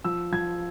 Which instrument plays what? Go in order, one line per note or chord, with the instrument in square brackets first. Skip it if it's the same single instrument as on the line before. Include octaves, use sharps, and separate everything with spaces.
[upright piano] F3 E6
F3 G#6